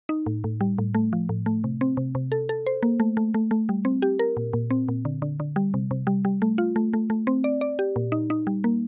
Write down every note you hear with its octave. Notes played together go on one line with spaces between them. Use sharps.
D#4
A2
A2
G3
A2
A3
F3
A2
A3
C3
C4
C3
C3
A4
A4
C5
A#3
A3
A3
A3
A3
G3
C4
G4
A#4
A#2
A#2
C4
A#2
D3
D3
D3
G3
C3
C3
G3
G3
A3
F4
A3
A3
A3
C4
D5
D5
G4
A#2
D#4
D#4
G3
A#3